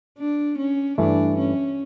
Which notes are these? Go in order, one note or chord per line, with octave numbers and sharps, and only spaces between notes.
D4
C#4
G2 E3 A3 D4
C#4